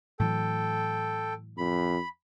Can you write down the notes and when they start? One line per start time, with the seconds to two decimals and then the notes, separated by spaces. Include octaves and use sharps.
0.20 A2 E3 F#3 A4 G5
1.58 F2 B5